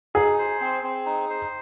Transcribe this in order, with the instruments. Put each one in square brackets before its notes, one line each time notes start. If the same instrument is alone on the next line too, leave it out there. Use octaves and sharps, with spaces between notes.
[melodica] D#4 [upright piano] G#4
[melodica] C5
C4
C4
D#4
C5